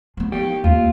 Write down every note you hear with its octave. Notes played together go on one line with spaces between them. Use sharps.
F3 B3
G4
D#2 F4